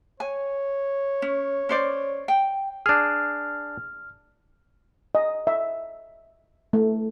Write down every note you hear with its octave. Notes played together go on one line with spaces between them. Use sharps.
C#5 G#5
C#4
C#4 C5 D5
G5
D4 G#4 F6
D#5
E5
A3